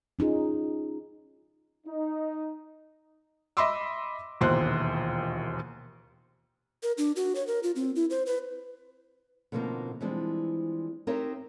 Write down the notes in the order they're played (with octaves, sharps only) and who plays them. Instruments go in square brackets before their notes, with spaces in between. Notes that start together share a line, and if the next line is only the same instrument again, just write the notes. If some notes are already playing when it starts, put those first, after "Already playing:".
[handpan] C#4 D#4 F4 G#4
[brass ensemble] D#4
[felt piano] D#5 E5 B5 C6 D6 E6
E1 A#1 D#2 C5 F#6
[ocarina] A#4
D4
F#4
C#5
A#4
F4
C4
E4
C5
B4
[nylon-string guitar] B2 D3 F3 A#3 C4 D#4
E3 F3 G3 G#3 C4 D4
C4 D#4 G4 A#4 C#5 E5